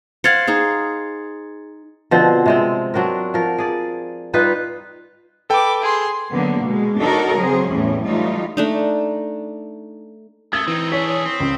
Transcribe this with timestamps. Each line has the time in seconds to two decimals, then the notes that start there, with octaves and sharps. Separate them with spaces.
0.24 C5 F5 F#5 G#6 A6 C#7
0.47 D#4 G#4 C5
2.11 B2 D3 F3 C4
2.46 C3 G#3 C4
2.94 F#3 C4 D4 A#4
3.34 F3 A#4
3.58 G#4 D5
4.33 G3 D#4 F4 B4
5.50 A4 B4 G5 D6
5.82 G#4 C6
6.33 D3 F#3 A#3 B3
6.63 B2 G#3
7.01 D4 D#4 F#4 A4 A#4 C#5
7.39 C#3 F#3 C4 G#4 C5
7.68 E2 A2 E3 G3 C#4
8.06 E3 F#3 G3 A3 D#4 F4
8.57 A3 D4 D#4
10.53 A3 D#6 E6 G#6 G7
10.68 E3 C4 D#4
10.92 D4 G#4 C#5 B6
11.25 C4
11.40 C#2